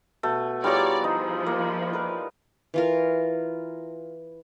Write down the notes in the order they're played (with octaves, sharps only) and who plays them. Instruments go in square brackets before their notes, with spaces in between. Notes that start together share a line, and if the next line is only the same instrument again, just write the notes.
[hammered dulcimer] B2 [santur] A3
[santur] G3 A#5 [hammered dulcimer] E4 F4 G#4 [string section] C#5 D5
[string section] F3 [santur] D#4
[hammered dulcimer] A#3
A#4 B4
[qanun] E3 F4 A#4